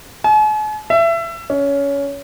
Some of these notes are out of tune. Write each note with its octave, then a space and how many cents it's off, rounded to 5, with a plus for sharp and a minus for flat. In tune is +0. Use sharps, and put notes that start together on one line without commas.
G#5 +45
E5 +25
C#4 +20